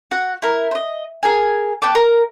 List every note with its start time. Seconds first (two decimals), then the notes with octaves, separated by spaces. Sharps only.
0.11 F#4 F#5
0.42 E4 A#4
0.71 C5 D#5
1.23 G#4 A#4 G#5
1.82 B3 G5 A5 D6
1.95 A#4